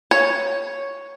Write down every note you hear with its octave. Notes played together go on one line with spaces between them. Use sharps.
C#5